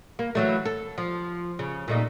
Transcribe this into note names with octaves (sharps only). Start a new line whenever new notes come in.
A#3
E3 F#3 A3
A4
F3
C#3
A#2 A3 D#4